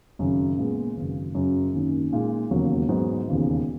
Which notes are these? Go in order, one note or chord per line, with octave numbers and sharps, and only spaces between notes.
G#1 F#2 C#3 F#3 C#4
A#2 G#3 B3
G#1 F#2 C#3
F#2 C#3 F#3
G#1 F#2 D#3 A#3 C#4
A#2 G#3 D#4
E1 D#2 C#3 F#3 A#3
G#2 F#3 B3 D#4
E1 D#2 C#3